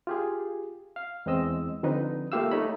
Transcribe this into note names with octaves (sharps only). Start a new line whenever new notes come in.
F4 G4 G#4
F5
E2 G#3 C4 D#5 E6
D3 F3 C4 D#4 B4
A3 A#3 F4 G4 F5 E6
A3 D#4 C#5 B5